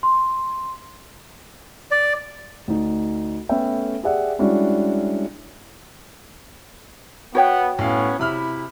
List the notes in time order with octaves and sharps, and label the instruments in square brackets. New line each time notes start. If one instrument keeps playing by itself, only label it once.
[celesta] C6
[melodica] D5
[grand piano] D2 D#4
A3 B3 C#4 A4 E5 G5
G4 G#4 D5 E5 F#5
G3 G#3 C#4 D4 E4 F#4
[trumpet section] B3 [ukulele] F#4 C#5 G5
[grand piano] A2 F5 [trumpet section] B3 C#4
[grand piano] C3 B5 F6 [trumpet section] E4